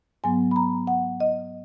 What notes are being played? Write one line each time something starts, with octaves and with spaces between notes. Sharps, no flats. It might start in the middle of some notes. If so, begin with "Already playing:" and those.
G#2 F#3 B3 G#5
B5
A#5
F#5
D#5